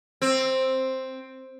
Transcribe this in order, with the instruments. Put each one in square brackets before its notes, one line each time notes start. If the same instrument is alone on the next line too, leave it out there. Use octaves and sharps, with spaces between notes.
[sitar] C4